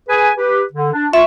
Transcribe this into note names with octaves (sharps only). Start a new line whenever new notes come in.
G#4 B4 G#5
G4 B4
D3
D4
F4 E5 C#6